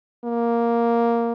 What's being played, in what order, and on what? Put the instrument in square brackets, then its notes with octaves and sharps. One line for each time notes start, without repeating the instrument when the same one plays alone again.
[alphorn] A#3